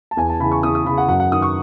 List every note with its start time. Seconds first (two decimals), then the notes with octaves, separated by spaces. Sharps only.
0.11 A5
0.17 E2 G#5
0.29 A5
0.40 C#3 E3 B5
0.52 C#6
0.63 E2 D#6
0.75 D#6
0.86 C#3 E3 B5
0.98 F#5
1.08 F#2 F#5
1.20 F#5
1.31 D#3 D#6
1.42 C#6